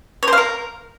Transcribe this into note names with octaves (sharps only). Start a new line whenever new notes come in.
C#5
C5
F5
A#4